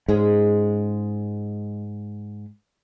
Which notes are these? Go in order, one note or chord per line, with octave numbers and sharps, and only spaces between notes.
G#2 G#3 C#4 G#4